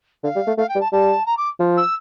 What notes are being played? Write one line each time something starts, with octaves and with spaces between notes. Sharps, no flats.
D3 F5
G3
A3
A3 F5
G5
G3
A5
G3 A5
A#5
D6
F3
E6